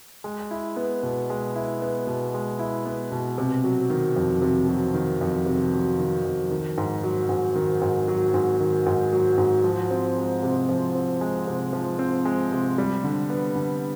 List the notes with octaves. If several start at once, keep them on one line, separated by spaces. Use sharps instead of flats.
G#3
E4
B3
B2
G#3
E4
B3
B2
G#3
E4
B3
B2
C3
F#3
D#3
F2
C3
F#3
D#3
F2
C3
F#3
D#3
F2
D#3
G#2
F#3
G#2
D#3
G#2
F#3
G#2
D#3
G#2
F#3
G#2
F3
C4
G#3
C3
F3
C4
G#3
C3
F3
C4
G#3
C3
G3
D3
B3
D3